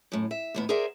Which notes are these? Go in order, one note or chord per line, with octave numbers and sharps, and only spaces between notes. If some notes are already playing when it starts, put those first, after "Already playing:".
F#2 A2
E5
D#2 A2 B3
G#4 A#4 C5 D5 E5 F#5